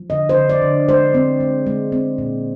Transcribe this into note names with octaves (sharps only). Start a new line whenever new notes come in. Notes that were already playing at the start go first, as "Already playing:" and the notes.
Already playing: F3
D3 D#5
C5
D3
D5
D3
G#3 C5
C4
G#3
G#3
C4
A#2